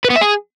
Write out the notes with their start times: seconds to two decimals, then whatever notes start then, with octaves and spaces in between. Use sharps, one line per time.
0.05 B4
0.10 B3
0.16 E5
0.21 G#4